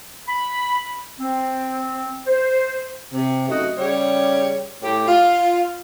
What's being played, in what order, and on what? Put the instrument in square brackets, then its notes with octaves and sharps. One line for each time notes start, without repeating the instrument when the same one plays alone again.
[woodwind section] B5
C4
C5
[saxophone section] C3
F#2 A3 D#4 F#4 D#5
C#3 G3 G4 C#5
A2 G4
F4